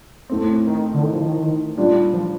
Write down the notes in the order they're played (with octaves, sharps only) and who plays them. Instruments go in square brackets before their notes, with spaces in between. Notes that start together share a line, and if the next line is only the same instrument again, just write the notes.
[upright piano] A2 A3 C4
[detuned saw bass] D#3
D3
D#3
F3
D#3
[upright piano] A#2 G3 D4 F4
[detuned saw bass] F3